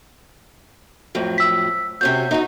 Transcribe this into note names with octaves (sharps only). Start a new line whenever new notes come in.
F2 A2 F#3
E6 B6
C3 C#4 F#4 G6
D#4 F#4 D#5